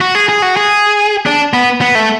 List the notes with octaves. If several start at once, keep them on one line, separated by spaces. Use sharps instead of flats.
F#4
G#4
G#4
F#4
G#4
D4
B3
B3
A3